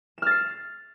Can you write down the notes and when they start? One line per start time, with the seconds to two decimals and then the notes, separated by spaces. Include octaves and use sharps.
0.18 E7
0.22 F6
0.27 A6
0.31 C7